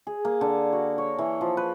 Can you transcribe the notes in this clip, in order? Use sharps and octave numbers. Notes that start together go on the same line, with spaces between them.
G#4
A#3
D3
F#4
C#5
E3
F3
B4